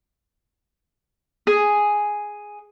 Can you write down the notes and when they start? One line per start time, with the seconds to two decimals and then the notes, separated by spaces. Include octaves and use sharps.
1.47 G#4